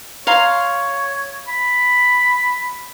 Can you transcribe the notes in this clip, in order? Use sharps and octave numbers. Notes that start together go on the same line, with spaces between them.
C#5 F5 A#5 C6
B5